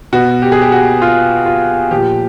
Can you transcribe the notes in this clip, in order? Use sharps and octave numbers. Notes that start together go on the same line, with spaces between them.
B2 F#4
G4
G#4
G4
F#4
F4
F4
A#2 F3 G4